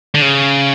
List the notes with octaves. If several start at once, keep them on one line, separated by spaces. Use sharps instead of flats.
D3
C#3